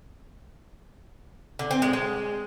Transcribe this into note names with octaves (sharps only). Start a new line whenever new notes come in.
D3
C4
G#3
G#3